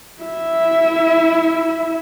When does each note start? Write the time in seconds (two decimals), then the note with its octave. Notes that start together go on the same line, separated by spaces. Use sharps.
0.22 E4 E5